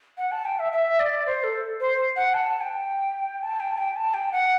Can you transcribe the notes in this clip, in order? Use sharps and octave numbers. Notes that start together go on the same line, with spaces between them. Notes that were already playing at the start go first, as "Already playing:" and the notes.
F#5
A5
G5
E5
E5
D5
C5
A4
C5
F#5
A5
G5
A5
G5
A5
G5
A5
G5
F#5